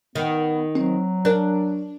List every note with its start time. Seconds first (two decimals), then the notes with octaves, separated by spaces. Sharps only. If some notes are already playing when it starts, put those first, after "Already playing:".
0.15 D#3 B3
0.75 F#3 C4
1.25 D4 A#4 F#6